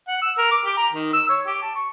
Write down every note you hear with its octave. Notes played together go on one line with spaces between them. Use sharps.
F#5
E6
A#4
D6
G4
A#5
D#3
E6
C#5
G4
A5
C#6